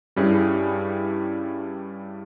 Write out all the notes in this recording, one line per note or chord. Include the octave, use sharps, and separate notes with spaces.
G2 G3 C#4 E4 G#4